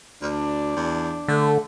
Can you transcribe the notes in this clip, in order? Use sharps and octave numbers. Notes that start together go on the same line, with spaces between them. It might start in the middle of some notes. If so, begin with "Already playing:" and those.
D2 D4
E2
D3 A3 A4